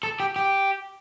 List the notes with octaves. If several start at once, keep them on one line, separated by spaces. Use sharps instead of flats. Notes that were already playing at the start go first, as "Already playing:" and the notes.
A4
G4
G4